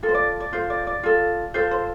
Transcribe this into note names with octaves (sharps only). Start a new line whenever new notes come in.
F4 A4
C5
D5
D5
F4 A4 C5
D5
D5
F4 A4
F4 A4 C5
C5